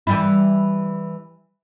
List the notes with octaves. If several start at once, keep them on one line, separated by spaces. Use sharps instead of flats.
E3 G3 E4